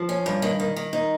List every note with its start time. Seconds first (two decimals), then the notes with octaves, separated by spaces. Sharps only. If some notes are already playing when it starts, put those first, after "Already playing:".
Already playing: F3
0.09 C#4
0.26 G2
0.42 D#3
0.60 D#3
0.76 D#3
0.93 D#4